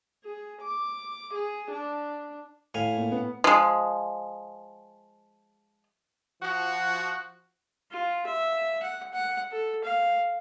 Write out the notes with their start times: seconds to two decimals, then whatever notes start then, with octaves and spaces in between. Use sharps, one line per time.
0.24 G#4
0.62 D6
1.34 G#4
1.71 D4
2.74 A2 F5 G#5
2.98 A#2
3.12 B3
3.44 F3 G#3
6.42 F3 F#4
7.91 F4
8.26 E5
8.83 F#5
9.13 F#5
9.51 A4
9.84 F5